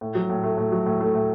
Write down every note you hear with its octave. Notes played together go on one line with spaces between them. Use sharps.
A2
F#3
A2
A3
A2
F#3
A2
A3
A2